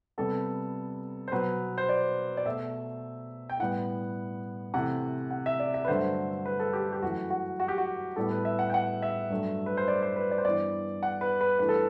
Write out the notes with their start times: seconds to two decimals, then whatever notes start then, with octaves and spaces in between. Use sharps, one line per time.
0.18 C3 G3 B3 A4
1.28 C5
1.31 B2 F#3 B3 B4
1.78 C5
1.89 D5
2.37 D5
2.45 B2 A3 E5
3.50 G5
3.59 A2 G3 B3 F#5
4.74 C3 E3 A3 F#5
5.31 F#5
5.46 E5
5.60 D5
5.74 E5
5.85 B4
5.88 G2 D3 F#3 A3 C5
6.46 B4
6.60 A4
6.73 G4
6.93 G4
7.02 F#2 E3 A3 F#4
7.30 F#4
7.60 F#4
7.68 G4
7.78 F#4
8.16 A2 G3 B3 A4
8.31 B4
8.45 E5
8.59 F#5
8.70 G5
8.74 F#5
9.02 E5
9.30 G2 F#3 A3
9.66 B4
9.77 C5
9.88 D5
10.02 C5
10.16 B4
10.31 D5
10.38 C5
10.45 G2 E3 B3 D5
11.03 F#5
11.21 B4
11.41 B4
11.59 G2 E3 A3 B4
11.69 A4